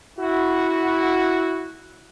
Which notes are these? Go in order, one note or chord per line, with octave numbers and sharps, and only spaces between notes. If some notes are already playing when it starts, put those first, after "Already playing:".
E4 F#4